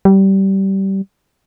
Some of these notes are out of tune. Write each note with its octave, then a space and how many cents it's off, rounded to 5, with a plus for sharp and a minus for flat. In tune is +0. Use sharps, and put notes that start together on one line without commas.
G3 -20